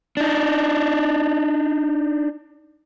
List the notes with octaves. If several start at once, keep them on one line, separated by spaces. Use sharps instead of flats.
D4 D#4